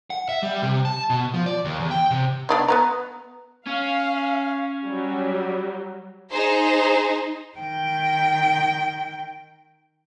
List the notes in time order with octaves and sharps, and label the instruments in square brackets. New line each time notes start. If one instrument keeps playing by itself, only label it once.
[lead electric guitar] F#5
E5
G3
C3
A5
B2
F3
D5
D#2
E2
G5
C3
[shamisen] B3 D4 D#4
B3 B4 A#5
[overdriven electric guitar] C#4 [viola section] F5
[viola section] F#3 G3
[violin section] D#4 G#4 C5
[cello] D#3 G5